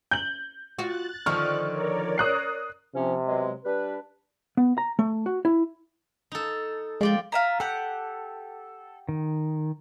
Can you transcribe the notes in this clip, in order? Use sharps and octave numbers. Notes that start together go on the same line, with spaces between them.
G6 F#7
F4 F#4 F#6 A6
D3 D#3 F3 C#6 F6
A#4 C#5 D5
D#6 F#6 C7
C3 F3 C#4
B2 F#3 G#3
G3 D4 B4
B3
A#5
A3
F#4
E4
D#4 A4
F3 G#3 D5 G5
F4 E5 A#5
G4 A4 F#5
D#3